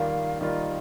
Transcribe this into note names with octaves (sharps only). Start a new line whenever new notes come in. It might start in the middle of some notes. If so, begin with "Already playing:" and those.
Already playing: D#3 G3 A#3 F4 F5
D#3 G3 A#3 F4 D#5